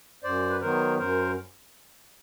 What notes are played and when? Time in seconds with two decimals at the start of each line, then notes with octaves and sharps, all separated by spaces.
0.24 F#2 C5 D5
0.50 B4
0.60 D#3 F#3 B3 A#4 C5
0.98 F#2 A#4 C5